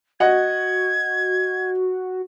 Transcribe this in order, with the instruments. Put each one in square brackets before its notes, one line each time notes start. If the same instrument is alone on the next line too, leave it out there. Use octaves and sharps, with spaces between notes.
[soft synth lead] F#4 [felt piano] D#5 F#5 [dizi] G#6